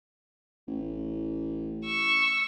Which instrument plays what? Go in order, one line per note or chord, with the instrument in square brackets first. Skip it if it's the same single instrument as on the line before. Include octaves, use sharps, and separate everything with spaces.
[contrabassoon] A1
[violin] C#6 E6